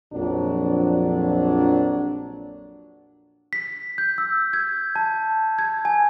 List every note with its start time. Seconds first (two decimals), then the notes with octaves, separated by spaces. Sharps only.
0.13 A#1 F2 F#3 D4
3.53 B6
3.98 G6
4.18 E6
4.53 G#6
4.96 A5
5.59 G#6
5.85 G#5